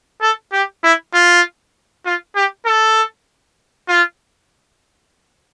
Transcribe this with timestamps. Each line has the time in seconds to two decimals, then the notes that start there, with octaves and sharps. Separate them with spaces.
0.22 A4
0.53 G4
0.83 E4
1.14 F4
2.05 F4
2.36 G4
2.66 A4
3.88 F4